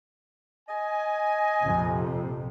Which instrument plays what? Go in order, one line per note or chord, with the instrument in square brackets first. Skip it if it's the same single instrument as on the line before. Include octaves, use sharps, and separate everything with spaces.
[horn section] D#5 G#5
[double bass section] A#1 F2 C3